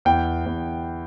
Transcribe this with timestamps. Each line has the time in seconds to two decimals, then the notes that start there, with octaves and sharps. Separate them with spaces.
0.05 E2 G5
0.46 E2